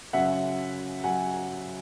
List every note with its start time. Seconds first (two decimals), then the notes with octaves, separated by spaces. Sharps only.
0.13 F#2 C#3 F#3 E5 F#5
1.04 F#3 F#5 G#5